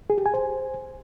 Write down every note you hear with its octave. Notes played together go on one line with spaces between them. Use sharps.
G#4
G4
G#5
C5